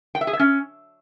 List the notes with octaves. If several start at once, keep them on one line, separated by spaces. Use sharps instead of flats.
G5
E5
G#4
E5
C#4